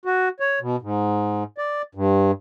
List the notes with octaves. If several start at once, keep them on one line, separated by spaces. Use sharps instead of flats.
F#4
C#5
B2
G#2
D5
G2